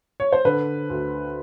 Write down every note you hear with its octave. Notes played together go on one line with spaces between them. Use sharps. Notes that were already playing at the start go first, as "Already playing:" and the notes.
C#5
C5
D3 B4
D2